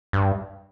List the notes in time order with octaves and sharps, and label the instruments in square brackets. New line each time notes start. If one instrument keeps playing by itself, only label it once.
[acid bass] G2